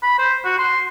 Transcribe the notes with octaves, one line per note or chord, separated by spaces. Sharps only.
B5
C5
F#4
C6